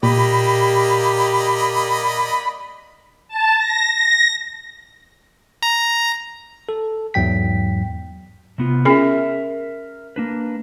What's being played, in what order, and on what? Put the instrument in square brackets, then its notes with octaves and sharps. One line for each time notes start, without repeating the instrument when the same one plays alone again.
[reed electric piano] A#2 [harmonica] A#3 D5 D#5 [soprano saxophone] G4 [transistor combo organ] B5
[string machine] A5
A#6
A#6
[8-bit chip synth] A#5
[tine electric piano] A4
E2 G#2 F#3 G5 B6
[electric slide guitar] C3 B3 F4
[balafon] C#4 G#4 [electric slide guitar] A#4 E5
[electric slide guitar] A#3 D4 B4